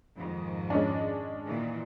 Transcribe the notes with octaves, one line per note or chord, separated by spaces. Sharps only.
F2 G#2 D#3
G#3 C#4 D4
A#2 D#3 E3